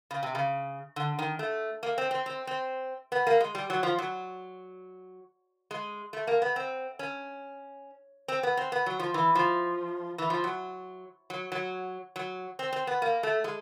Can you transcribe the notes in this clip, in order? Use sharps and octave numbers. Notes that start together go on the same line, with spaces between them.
C#3
C3
C#3
D3
D#3
A3
A#3
C4
C4
C4
C4
B3
A#3
G#3
G3
F#3
F3
F#3
G#3
A3
A#3
B3
C4
C#4
C4
B3
C4
B3
F#3
F3
E3
F3
E3
F3
F#3
F#3
F#3
F#3
C4
C4
B3
A#3
A3
G#3